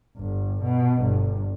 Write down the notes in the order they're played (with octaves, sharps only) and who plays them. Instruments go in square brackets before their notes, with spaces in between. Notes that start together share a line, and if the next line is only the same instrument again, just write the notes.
[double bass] G1
B2
G1